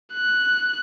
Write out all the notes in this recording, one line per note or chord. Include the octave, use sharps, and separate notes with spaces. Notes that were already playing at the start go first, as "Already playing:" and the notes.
F#6